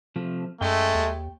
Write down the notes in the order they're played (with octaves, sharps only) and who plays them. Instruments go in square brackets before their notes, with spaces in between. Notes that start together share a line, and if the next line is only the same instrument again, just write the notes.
[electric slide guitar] C3 F3 A3
[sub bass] F#2 [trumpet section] G#3 A3 [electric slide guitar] G5
[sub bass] D#2